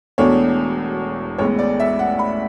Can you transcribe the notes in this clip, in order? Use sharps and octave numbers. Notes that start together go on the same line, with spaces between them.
E1 E2 B2 A3 D4 C#5
A1 A2 G#3 B3 C#5
D5
E5
F#5
B5